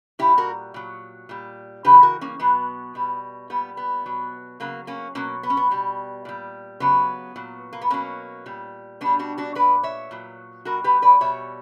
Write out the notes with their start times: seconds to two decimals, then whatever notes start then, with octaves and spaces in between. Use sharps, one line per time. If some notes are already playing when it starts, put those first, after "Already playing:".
0.19 A#2 G3 E4 G4
0.38 F#4 A#4
0.74 A#2 F#3
1.29 A#2 G3
1.85 C#3 E3 G3 G4 B4
2.03 F#4 A#4
2.21 A#3 C#4
2.40 B2 F#3 B3
2.95 B2 G3
3.50 A#2 G3 B3
3.77 B3
4.06 B2 F#3
4.60 C#3 F#3 A#3
4.87 A#3 C#4
5.15 B2 F#3 A#3 C#4
5.43 B3
5.50 C#4
5.57 B3
5.71 B2 G3
6.25 A#2 G3
6.80 C#3 F#3 B3
7.36 A#2 F#3
7.73 A#3
7.81 B3
7.90 B2 F#3 A#3 C#4
8.46 A#2 G3
9.01 B2 G3 B3 D4
9.19 D4 F#4
9.38 D4 F#4
9.55 A#2 F#3 B4 D5
9.83 C#5 E5
10.11 A#2 F#3
10.65 B2 G3 F#4 A#4
10.84 G4 B4
11.02 B4 D5
11.21 B2 G3 C#5 E5